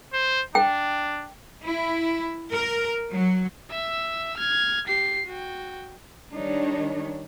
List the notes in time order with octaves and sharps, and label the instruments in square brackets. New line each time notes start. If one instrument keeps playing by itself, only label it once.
[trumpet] C5
[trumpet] D4 [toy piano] G5
[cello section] E4
A#4
F#3
[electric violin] E5 E6
F6 G#6
G4 C7
F#4 G5
[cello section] D#3 G3 D4 D#4 C#5